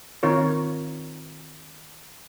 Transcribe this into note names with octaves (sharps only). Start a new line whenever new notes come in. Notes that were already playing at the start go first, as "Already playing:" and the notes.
D#3 C4 F4 A#4 C#5